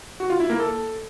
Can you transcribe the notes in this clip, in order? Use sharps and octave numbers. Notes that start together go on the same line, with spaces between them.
F#4
F4
E4
A#3
A4